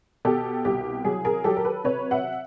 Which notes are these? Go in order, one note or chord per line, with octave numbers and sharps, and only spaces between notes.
B2 G4 A4
C2 G4
F#3 G#4
G#4 A#4
F#3 G4 A4
A#4
A4 B4
C3 B4 C#5
E5 F#5